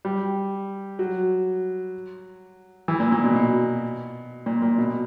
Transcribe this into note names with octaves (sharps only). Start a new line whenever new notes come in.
G3
F#3
E3
A#2
A#2
B2
B2
A#2
A#2
B2